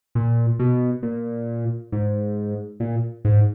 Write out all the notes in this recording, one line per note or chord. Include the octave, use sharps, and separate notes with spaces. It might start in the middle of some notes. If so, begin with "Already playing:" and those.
A#2
B2
A#2
G#2
A#2
G#2